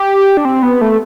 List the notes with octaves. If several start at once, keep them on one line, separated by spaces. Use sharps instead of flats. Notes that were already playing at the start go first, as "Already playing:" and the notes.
Already playing: G4
D4
C4
B3
A3